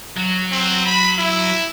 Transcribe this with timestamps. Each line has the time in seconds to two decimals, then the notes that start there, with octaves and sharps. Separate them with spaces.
0.17 F#3
0.52 C4
0.86 B5
1.18 E4